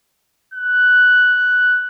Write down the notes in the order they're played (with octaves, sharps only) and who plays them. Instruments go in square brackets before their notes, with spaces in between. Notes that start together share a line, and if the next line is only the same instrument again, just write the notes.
[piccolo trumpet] F#6